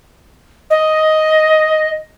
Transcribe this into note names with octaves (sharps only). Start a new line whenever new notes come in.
D#5